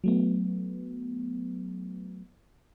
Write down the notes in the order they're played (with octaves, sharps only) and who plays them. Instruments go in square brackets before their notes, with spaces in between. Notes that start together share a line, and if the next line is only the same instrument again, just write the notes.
[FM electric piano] F#3 A3 B3